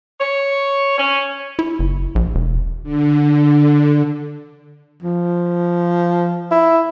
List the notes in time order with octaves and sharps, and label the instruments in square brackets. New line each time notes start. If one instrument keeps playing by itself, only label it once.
[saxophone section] C#5
C#4
[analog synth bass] E4
F#1
A#1
E1
[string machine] D3
[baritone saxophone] F3
[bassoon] E4